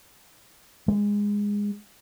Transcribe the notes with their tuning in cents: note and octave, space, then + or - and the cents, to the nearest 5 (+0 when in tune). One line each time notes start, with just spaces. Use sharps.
G#3 -15